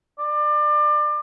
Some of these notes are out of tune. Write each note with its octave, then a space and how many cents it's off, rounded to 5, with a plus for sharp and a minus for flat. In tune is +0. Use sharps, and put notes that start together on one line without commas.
D5 +30